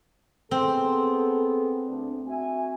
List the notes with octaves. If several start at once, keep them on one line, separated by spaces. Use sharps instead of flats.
B3 C4 G#4 A4
D2 D4
F#4 E5 G#5